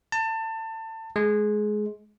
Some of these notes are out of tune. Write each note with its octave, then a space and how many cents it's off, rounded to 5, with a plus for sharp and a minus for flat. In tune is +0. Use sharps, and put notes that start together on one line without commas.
A5 +25
G#3 +20